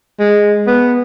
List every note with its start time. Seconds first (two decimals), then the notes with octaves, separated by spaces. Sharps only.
0.20 G#3
0.67 B3